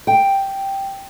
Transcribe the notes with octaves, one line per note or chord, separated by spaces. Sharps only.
G5